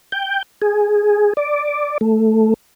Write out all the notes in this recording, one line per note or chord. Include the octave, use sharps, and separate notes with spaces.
G5
G#4
D5
A3